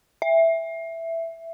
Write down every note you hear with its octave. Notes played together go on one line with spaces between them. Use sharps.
E5